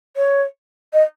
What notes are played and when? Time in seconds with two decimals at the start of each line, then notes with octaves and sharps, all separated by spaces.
0.17 C#5
0.93 D#5